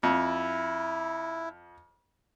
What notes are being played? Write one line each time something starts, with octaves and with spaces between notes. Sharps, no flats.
F2 E4